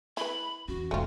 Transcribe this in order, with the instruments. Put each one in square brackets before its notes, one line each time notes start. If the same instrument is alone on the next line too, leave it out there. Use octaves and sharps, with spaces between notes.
[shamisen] E4 B4 [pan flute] B5
[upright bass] E2 C#4 [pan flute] F#4
[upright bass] E1 G#2 [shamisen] A3 C4 F4